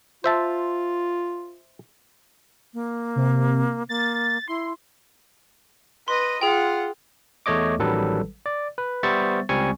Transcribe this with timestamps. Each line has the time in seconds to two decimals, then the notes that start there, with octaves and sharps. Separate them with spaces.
0.24 F4 C5 E5 A5
2.74 A#3
3.16 C3
3.89 A#3 A6
4.48 E4 C6
6.08 B4 D#5 C6
6.41 F4 G#4 F#5 G5
7.46 E2 A3 C#5 D#5 D6
7.79 A1 D#3 F#3 G3 A4 B4
8.46 D5
8.78 B4
9.03 G3 B3 C5 E5 C#6 A6
9.49 C#2 G3 C4 G#5 C#6